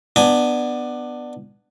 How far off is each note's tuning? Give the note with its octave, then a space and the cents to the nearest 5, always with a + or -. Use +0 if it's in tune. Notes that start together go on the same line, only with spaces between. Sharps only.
B3 +0 D4 +15 G#5 +0